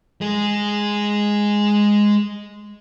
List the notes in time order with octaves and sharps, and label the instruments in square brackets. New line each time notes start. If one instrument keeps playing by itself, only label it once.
[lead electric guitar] G#3 G#4